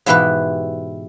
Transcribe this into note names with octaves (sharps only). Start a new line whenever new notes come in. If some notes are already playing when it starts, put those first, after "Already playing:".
G#2 B2 E3 E4 G4 B4